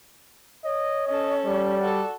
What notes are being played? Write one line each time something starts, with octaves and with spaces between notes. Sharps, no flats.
C#5 D#5
C#4 A4 D#5
G3 D5
F#4 A4